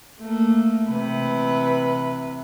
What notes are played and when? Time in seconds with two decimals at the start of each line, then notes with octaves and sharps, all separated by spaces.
0.20 A3 A#3
0.88 C3 E3 B4